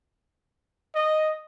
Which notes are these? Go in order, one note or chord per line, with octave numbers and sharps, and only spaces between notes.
D#5